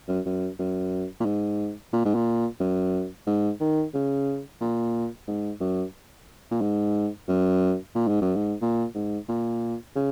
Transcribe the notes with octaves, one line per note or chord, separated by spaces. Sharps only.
F#2
F#2
F#2
A#2
G#2
A#2
G#2
A#2
F#2
G#2
D#3
C#3
A#2
G#2
F#2
A#2
G#2
F#2
A#2
G#2
F#2
G#2
A#2
G#2
A#2
C#3